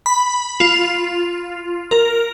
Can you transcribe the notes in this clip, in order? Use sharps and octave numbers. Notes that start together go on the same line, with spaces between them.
B5
F4
A#4